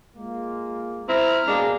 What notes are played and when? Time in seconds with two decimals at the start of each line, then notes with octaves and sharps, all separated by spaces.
0.17 G#3 A#3 F4
1.09 C4 E4 A#5 F6
1.48 B2 G#3 A#3 D4